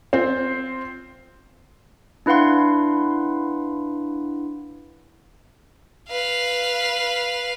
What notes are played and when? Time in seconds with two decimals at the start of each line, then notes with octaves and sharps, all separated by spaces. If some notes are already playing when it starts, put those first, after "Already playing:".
0.13 C4 F4 C5
2.26 D4 E4 B4 F5 F#5 C6
6.09 B4 F5